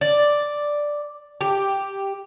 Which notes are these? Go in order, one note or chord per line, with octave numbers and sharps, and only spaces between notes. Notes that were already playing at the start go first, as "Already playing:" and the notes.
D5
G4